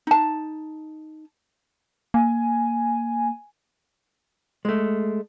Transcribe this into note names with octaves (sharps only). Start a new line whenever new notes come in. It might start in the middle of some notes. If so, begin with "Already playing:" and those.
D#4 A5
A#3 G#5
G#3 A3